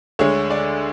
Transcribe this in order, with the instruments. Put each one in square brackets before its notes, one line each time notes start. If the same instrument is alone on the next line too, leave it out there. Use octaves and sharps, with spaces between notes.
[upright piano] D2 D3 G#3 C#5
D5